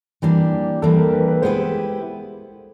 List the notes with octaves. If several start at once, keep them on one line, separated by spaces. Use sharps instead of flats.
E3 G3 A#3 D4
E3 G3 A#3 D4 A4
A#4
B4
B4
G#3 B3 E4 G4 B4 C5